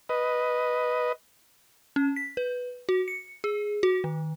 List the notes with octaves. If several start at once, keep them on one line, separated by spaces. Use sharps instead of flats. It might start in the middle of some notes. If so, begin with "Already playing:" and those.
B4 D#5
C#4
B6
B4
F#4
C#7
G#4
F#4
D#3